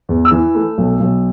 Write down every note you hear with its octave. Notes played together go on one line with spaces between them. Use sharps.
E2
E6
E3
A3
B1
B1